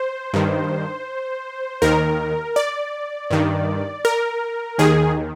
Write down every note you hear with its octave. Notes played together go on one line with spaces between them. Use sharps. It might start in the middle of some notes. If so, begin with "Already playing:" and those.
Already playing: C5
G2 D#3
D#2 D#3 A#4
D5
G2 D#3
A#4
D#2 D#3 G#4